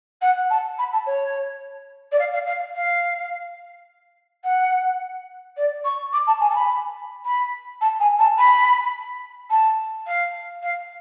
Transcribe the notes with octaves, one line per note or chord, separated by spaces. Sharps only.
F#5
A5
B5
A5
C#5
D5
F5
F5
F5
F5
F#5
D5
C#6
D6
A5
G#5
A5
B5
B5
A5
G#5
A5
B5
A5
F5
F5